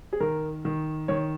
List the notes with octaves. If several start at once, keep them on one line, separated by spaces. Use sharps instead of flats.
G#4
D#3 A#4
D#3
D#3 C#5